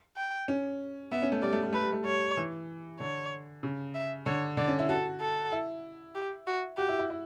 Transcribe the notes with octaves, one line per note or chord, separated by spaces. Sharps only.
G5
C#4
B3 E5
C#4
A3
G3 D5
A3
G3
A3 B4
G3
A3
G3 C#5
E3
D3 C#5
C#3
E5
D3 C#5
D3 D5
C#4
E4
F#4 A4
A4
E4
G4
F#4
F#4 G4
E4
E4
E4